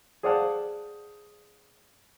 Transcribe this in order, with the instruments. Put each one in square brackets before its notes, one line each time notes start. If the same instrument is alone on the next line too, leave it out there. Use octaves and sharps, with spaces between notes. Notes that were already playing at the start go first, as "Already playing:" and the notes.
[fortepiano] G#4 C5 D5 F5 F#5 A5